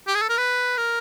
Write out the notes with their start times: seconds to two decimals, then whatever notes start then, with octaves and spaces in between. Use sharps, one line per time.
0.07 G4
0.15 G#4
0.22 A4
0.29 A#4
0.38 B4
0.77 A#4